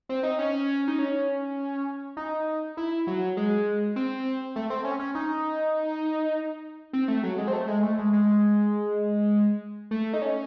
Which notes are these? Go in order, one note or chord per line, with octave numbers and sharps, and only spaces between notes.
C4
D#4
C#4
D#4
C#4
D#4
E4
F#3
G#3
C4
A3
C4
C#4
C#4
D#4
C4
A3
F#3
G#3
C4
A3
G#3
A3
G#3
G#3
A3
D#4
C#4